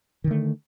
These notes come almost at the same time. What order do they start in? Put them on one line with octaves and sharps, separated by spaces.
D#3 D3 A3